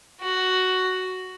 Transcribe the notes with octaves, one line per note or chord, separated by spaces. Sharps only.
F#4